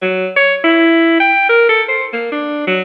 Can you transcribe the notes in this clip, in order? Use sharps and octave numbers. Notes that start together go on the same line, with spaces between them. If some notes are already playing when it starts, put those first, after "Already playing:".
F#3
C#5
E4
G5
A#4
A4
C5
A#3
D4
F#3